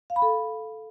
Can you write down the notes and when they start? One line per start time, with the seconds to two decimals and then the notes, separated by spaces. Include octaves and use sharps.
0.10 F5
0.16 B5
0.22 A4